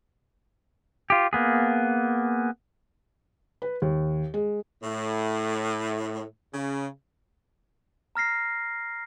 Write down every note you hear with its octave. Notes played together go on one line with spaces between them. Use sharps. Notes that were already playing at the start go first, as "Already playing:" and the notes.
F4 G4
A#3 B3 G#4
B4
D#2
G#3
A2
C#3
A#5 F6 A#6 C7